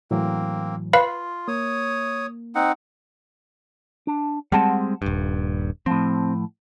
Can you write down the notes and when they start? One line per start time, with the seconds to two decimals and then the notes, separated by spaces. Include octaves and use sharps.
0.11 A2 E3 F#3 A#3 C4
0.93 F4 B4 F5 B5
1.48 A#3 C#5 D#6
2.55 C4 D#4 F#5
4.07 D4
4.52 G3 G#3 C4 F#5 A5
5.02 D#1 G2
5.86 A2 F3 C4